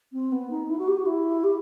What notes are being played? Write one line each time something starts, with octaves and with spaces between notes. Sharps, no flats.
C4
B3
D#4
E4
F#4
G4
F#4
E4
G4